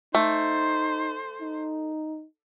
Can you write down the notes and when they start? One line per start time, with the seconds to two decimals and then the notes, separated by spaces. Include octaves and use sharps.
0.14 A3 D#4 C5
1.41 D#4